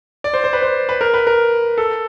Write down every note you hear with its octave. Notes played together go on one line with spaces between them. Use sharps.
D5
C5
C5
B4
C5
B4
A#4
B4
A#4
A4